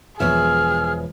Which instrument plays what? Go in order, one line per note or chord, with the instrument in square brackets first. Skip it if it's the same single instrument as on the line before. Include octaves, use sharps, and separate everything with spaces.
[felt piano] E1 F3 [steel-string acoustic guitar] B3 C#5 E5 [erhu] G#4 [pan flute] F6